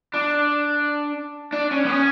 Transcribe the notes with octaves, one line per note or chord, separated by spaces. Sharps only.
D4
D4
C#4
B3
C#4